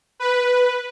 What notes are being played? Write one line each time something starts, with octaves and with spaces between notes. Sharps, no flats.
B4